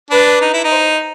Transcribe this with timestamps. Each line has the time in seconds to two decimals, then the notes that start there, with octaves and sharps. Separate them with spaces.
0.11 D4 B4
0.41 D#4
0.53 E4
0.64 D#4
0.72 C5